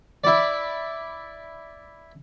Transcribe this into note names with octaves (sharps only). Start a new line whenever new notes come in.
E4 D5